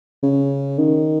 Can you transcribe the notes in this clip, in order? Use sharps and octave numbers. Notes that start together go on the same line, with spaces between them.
C#3
D#3